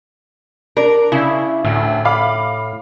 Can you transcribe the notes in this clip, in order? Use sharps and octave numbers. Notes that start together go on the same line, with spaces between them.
D4 A#4
C#3 E4
D2 A2
F5 B5 D6